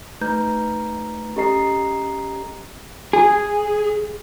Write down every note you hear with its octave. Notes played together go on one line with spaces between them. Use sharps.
A3 D#4 B4 A#5 G6
C#4 G4 A4 D#5 A#5 C7
G#4